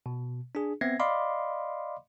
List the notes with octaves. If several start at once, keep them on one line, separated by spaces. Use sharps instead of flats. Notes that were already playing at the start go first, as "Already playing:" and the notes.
B2
D4 G#4
B3 C4 E5 G#6 A#6 C7
D5 D#5 F5 B5 C6 D6